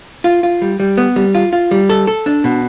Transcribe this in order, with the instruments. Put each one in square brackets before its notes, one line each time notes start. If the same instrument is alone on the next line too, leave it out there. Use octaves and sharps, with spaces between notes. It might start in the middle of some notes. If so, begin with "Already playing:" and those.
[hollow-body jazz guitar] F4
F4
G3
G3
B3
G3
F4
F4
G3
A4
A4
D4
B2